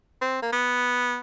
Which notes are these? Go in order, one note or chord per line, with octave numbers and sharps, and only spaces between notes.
C4
A#3
B3